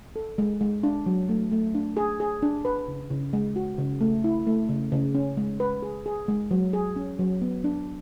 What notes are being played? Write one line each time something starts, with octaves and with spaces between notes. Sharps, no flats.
A4
G#3
G#3
D4
F#3
A3
A3
D4
G#4
G#4
D4
B4
C#3
C#3
G#3
F#4
C#3
A3
E4
A3
C#3
C#3
C#4
G#3
B4
G#4
G#4
G#3
F#3
G#4
C#4
F#3
B3
D4